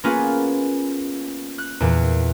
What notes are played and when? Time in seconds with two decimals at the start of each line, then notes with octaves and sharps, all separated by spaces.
0.04 A#3 B3 C#4 F4 G#4 B4
1.58 F#6
1.80 E2 A#2